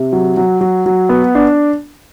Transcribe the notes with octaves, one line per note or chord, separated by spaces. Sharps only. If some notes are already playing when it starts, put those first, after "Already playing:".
Already playing: C3
F#3
F#3
F#3
F#3
B3
D4